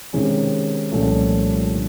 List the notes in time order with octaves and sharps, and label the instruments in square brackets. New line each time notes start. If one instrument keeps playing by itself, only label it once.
[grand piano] C3 D#3 G#3 C#4
C2 A#2 F3 A3 C#4
D3